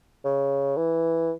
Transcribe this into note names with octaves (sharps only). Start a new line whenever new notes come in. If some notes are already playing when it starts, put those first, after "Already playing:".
C#3
E3